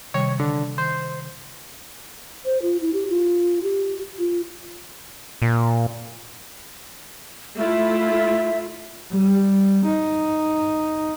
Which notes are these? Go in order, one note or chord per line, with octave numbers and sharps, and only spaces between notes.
C3 D#3 G3 C#5
D3
D#3 C5
C5
F4
E4
G4
F4
G4
F4
A#2
A3 E4 F4 E5
G3
D#4